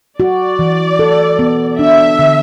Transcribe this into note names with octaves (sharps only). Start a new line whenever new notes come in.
F#4 D5
E3
A4
B3
D4 E5
D3